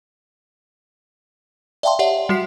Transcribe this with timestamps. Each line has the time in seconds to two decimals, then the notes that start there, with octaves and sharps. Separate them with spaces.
1.83 D5 E5 F5 G5 A5 C6
1.99 G4 C#5 D5 E5 F#5
2.29 G3 F#4 C7